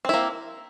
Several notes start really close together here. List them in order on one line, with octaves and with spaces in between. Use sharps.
C4 E4 A#3